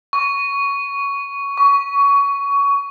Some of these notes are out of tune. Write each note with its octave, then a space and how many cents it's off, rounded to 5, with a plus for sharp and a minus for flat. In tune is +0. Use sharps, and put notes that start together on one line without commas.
C#6 +10
C#6 +20